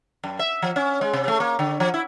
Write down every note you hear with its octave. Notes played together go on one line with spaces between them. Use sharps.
F#2
E5
F3
C#4
G#3
C3
A3
A#3
D3
F3
E4